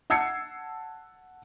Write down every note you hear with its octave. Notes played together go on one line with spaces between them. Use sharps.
F#5 A5 E6 G#6 C7 C#7